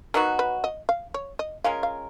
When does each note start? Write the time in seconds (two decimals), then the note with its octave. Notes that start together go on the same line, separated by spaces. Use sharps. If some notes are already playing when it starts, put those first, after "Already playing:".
0.14 F#3 B3 D#4 F#4 A#4
0.39 B4
0.64 D#5
0.89 F5
1.14 C#5
1.39 D#5
1.64 G#3 C#4 F4 A#4 F5
1.83 F5